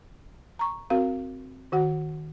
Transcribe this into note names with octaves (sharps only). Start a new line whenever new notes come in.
A#5 C#6
C4 F#4 A#4 F5
D#3 F#4 F#5